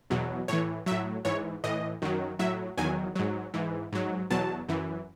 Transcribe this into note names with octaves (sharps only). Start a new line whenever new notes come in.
E2 B2 F#3
A2 E3 C#5
A2 F#3 E5
G#2 E3 C#5
A2 E3 D#5
F#2 D#3 F#3
A2 F#3 E5
E2 D#3 F#3 G#5
G#2 F#3
G#2 E3
G#2 F#3
E2 B2 F#3 A5
F#2 E3